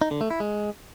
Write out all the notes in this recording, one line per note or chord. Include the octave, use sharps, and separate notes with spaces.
D#4
D3
A3
E4
G#3